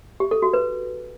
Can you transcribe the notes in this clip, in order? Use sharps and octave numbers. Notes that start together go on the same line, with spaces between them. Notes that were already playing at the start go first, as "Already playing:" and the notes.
G4
A4
F#4
B4